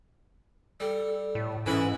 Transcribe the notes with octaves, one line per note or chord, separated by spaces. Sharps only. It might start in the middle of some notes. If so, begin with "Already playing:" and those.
G3 A4
A2
G#2 E3 C#4 A4 B4 E5